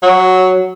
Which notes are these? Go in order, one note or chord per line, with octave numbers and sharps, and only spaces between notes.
F#3